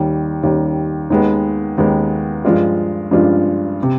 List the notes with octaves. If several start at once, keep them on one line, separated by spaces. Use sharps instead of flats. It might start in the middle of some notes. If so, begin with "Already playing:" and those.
Already playing: D#2 D#3 G3
D#2 D#3 G3
D#2 D#3 G#3 B3
D#2 D#3 G#3 B3
G2 F3 G#3 D4 F4
G2 F3 G#3 D4 F4
C3